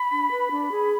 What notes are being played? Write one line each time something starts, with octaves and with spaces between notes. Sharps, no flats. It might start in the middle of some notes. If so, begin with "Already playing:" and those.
Already playing: B5
D4
B4
D4
G#4